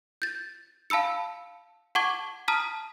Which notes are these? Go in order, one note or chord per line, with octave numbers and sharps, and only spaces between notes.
G6 A6
F5 A5 B5 E6 C#7
F#5 A5 C#6 D6 G#6
A5 A#5 D#6 F6 B6